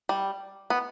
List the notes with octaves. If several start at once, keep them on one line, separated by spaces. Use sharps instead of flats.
G3
B3